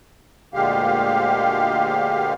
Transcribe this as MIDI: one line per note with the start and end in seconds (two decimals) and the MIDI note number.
0.54 2.34 38
0.54 2.34 46
0.54 2.34 50
0.54 2.34 56
0.54 2.34 67
0.54 2.34 77